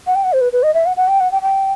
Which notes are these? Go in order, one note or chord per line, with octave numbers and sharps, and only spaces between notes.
F#5
G5
F#5
C5
B4
B4
D#5
E5
F#5
F#5
G5
F#5
G5
G5